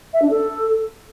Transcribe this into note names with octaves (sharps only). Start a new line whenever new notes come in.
E5
D4
A4